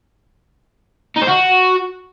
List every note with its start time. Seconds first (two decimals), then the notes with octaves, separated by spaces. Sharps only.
1.17 D#4
1.23 C5
1.28 F#4